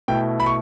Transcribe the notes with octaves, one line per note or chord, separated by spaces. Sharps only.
B2 A3 E4 G5
B5
C#6